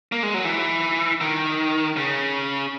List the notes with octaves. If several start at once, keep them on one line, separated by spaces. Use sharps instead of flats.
A#3
G#3
F#3
E3
D#3
C#3